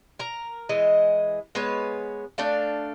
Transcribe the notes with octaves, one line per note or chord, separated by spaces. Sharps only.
A#4 A#5
E3 G#3 D#5
G#3 B3 B4 C#5
A3 D4 A4 F5